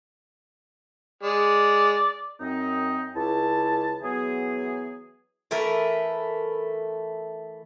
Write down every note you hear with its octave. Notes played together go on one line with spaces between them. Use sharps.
G#3 D5
F#2 C4 D#4
C#2 E4 A5
E3 F#3 B3 G#4
E3 A3 A#4 B4